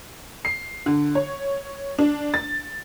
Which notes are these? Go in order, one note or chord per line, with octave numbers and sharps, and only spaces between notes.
C7
D3
C#5
D4
A6